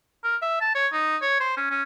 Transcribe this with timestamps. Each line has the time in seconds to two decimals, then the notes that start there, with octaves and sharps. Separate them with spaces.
0.24 A#4
0.42 E5
0.61 A5
0.75 C#5
0.93 D#4
1.22 C#5
1.40 C5
1.57 C#4
1.70 C#4